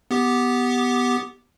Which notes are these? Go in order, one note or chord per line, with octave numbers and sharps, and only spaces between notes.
B3 G4 D6